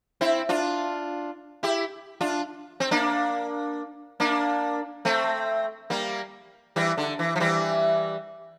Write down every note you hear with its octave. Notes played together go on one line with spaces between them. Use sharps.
C4 E4
D4 F4
E4 G4
D4 F4
C4
A#3 D4
A#3 D4
A3 C4
G3 A#3
E3 G3
D3
E3
F3
E3 G3